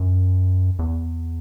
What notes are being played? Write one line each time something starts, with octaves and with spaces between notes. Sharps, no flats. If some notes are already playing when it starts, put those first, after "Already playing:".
Already playing: F#2
E2